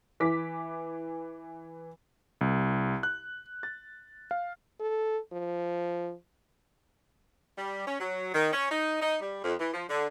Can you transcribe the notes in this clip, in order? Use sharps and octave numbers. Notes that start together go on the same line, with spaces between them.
E3 D6 B6
C2
F#6
A6
F5
A4
F3
G3
C#4
F#3
D#3
C#4
D#4
D#4
G3
F2
E3
F3
D3